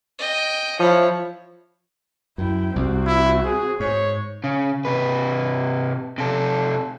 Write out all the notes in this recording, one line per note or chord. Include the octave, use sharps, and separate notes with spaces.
D#5 G5
F3 E4 C#5
F#2 E4 G5
C2 C4 F#4
E4
G#4
G#2 C#5
C#3
C3 B4
C3 A4